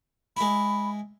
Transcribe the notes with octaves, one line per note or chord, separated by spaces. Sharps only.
G#3 E4 B5